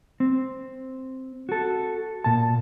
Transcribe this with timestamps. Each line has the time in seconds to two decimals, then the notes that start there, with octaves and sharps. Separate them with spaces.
0.20 C4
1.49 F#4 A4
2.24 A#2 A5